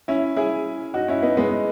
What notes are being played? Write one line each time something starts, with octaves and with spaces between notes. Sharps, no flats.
C#4 E4
E4 G#4
D#4 F#4
C#4 E4
B3 D#4
G#3 B3